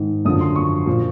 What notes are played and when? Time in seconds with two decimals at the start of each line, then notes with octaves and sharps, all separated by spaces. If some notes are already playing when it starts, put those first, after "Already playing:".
Already playing: G#2 D#3
0.25 F#2 D3 F3 D#6
0.41 C6
0.56 C#6
0.86 A#2 F3